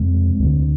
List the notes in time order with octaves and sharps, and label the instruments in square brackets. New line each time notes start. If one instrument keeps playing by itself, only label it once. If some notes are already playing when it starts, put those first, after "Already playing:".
Already playing: [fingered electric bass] F2 C3 G#3 C4
D2 D3